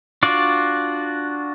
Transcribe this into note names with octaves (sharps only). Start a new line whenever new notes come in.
D4 F4 F#4 D5